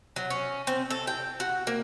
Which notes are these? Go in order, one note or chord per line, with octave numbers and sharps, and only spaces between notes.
F#3
C#4
C4
A4
G5
F#4
A#3